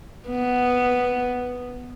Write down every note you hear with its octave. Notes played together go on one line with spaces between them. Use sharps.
B3